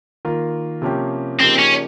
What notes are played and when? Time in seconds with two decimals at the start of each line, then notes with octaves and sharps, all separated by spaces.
0.25 D#3 A#3 F4 A#4
0.82 C3 F3 A#3 C#4 G4
1.40 C#3 F3 A#3 C4 D#4 G4
1.59 C#4